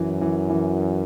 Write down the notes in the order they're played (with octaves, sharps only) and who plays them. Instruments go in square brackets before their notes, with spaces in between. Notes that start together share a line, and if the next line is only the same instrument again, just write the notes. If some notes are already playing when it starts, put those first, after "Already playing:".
Already playing: [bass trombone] F#2 [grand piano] E3
[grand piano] E3
E3